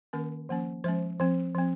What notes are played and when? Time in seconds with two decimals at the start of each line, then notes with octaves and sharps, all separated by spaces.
0.13 D#3 A#3 C#4 A#4
0.49 F3 A#3 C#4
0.84 F3 G#3 C#4 C5
1.20 F3 C4
1.55 F3 C4